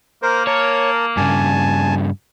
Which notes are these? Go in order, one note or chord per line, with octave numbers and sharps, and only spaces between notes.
A#3 A#4 C5
A#4 C#5 A5
G2 C#3 G#5 A5